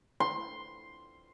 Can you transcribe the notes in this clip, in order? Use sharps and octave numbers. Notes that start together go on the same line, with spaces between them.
C6